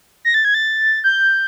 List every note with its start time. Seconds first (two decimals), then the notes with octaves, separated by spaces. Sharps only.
0.25 A#6
0.34 A6
0.45 G#6
0.54 A6
1.04 G6